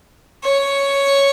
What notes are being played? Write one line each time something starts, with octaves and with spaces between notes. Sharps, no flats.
C#5